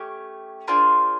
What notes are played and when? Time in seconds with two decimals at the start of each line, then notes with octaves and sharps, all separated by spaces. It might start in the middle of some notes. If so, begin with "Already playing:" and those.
Already playing: A3 C#4 G4 C#5
0.67 A#3 D4 F4 G#4 C5